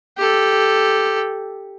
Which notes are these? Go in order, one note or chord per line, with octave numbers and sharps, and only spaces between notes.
G4 A4